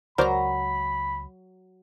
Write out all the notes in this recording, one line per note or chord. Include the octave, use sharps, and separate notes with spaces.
C#2 F#3 A#4 C5 D5 A#5 B5